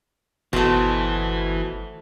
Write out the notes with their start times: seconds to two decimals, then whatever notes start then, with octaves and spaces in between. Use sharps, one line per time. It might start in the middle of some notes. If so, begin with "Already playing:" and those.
0.53 G1 B2 E3 A3 C4